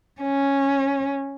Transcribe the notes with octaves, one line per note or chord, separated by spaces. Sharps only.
C#4